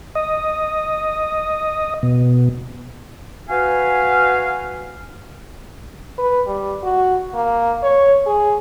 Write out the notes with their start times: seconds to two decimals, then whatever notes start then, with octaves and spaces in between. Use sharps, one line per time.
0.15 D#5
2.03 B2
3.49 F#4 B4 F5 G#5
6.18 B4
6.47 G3
6.83 F#4
7.34 A#3
7.83 C#5
8.26 G#4